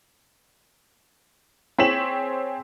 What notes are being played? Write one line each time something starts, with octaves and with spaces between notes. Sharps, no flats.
C4 G#4 C#5 B6 E7 F#7